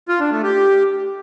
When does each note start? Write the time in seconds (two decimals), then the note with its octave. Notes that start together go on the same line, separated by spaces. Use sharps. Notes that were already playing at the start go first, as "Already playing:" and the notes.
0.09 F4
0.20 D4
0.31 A3
0.43 G4